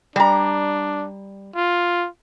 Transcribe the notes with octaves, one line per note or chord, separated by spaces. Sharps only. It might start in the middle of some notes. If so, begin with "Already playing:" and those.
G3 D4 A#5
F4